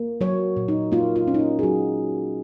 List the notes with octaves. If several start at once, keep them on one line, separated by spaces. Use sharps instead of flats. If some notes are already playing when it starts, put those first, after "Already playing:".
Already playing: A#3
F#3 C#5
A#2
D#4
A#3 F4
F4
C#4
D#4
F4
G#4
F#3 F#4